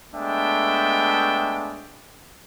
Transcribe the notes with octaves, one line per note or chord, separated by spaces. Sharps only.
G#3 A3 B3 D4 E5 G5